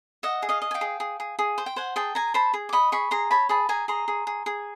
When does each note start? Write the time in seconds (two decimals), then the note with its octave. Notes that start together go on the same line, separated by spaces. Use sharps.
0.23 D#5 E5 F#5
0.42 G#4
0.49 D#5 F5
0.62 D#5
0.71 G#5
0.74 F5 G5
0.81 G#4
1.00 G#4
1.20 G#4
1.39 G#4
1.58 C5
1.66 G5
1.76 C5 F#5 G#5
1.96 G#4 G5 A5
2.15 G#4 G#5 A#5
2.34 C5 A5 B5
2.54 G#4
2.69 D6
2.73 D#5 B5 C#6
2.92 G#4 B5 C#6
3.11 G#4 A#5 C6
3.31 C#5 A5 B5
3.49 G#4 A5 B5
3.69 G#4 G#5 A#5
3.88 G#4 A#5 C6
4.08 G#4
4.27 G#4
4.46 G#4